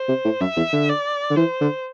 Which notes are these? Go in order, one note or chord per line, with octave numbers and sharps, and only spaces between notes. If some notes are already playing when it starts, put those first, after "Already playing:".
Already playing: C5
C3
A2
F#2 E5
E2
D3
D5
D3
E3 C5
D3